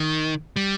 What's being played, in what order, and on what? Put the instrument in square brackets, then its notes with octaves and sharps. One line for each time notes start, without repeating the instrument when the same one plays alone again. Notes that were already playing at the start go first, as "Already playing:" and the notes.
Already playing: [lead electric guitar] D#3
G3